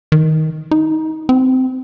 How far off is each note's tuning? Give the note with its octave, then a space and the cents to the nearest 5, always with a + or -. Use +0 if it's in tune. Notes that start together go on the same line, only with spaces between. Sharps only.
D#3 +15
D#4 +20
C4 -15